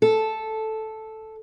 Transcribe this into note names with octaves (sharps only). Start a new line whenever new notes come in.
A4